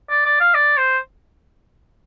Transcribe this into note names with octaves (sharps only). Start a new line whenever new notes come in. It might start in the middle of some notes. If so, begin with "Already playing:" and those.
D5
D5
F5
D5
C5